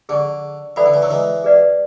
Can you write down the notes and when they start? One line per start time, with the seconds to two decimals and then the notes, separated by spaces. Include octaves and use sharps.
0.09 D3 G#4 D5 G#5 C#6
0.76 E3 A4 D5 F#5 B5
0.86 D3
0.94 E3
1.02 D3 F#3
1.11 E3 G#3
1.44 G#4 B4 D5 F#5